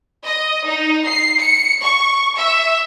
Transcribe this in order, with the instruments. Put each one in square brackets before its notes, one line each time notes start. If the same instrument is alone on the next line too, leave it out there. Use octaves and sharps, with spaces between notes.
[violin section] D#5
D#4
C7
C#7
C#6
E5